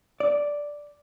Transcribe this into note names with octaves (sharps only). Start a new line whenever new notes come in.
D5